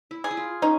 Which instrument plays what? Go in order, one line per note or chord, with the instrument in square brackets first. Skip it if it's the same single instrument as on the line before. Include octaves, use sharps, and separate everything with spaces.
[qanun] E4
[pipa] G#4
[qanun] E4
F4
[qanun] C#4 [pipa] D#4